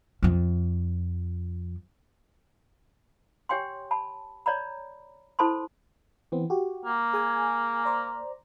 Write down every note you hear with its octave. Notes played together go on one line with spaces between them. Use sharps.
F2 F3
G4 C#5 G5 G#5 C6
A5 B5
C#5 D5 A#5 B5
E4 A4 C5 A5 B5 C6
E3 B3 C4
F#4 G4
A#3
G#4 G#5
C5 D5 A#5